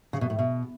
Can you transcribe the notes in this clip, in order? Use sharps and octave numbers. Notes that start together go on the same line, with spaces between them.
C#3
B2
A2
B2